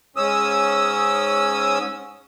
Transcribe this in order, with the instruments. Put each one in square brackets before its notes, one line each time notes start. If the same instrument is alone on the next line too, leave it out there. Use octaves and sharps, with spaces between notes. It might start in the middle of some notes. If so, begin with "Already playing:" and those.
[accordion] G#2 C#4 D#6 E6